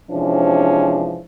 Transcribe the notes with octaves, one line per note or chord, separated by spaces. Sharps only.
C3 E3 F3 G#3 C#4 D4